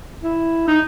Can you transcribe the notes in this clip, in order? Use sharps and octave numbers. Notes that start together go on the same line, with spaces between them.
E4
D#4